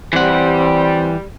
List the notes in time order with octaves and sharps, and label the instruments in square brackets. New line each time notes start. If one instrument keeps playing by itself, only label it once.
[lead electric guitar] E3 F#5 [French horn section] G3 [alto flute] C4